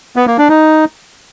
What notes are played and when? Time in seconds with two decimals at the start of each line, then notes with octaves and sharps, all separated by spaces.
0.16 B3
0.27 A#3
0.38 D4
0.49 D#4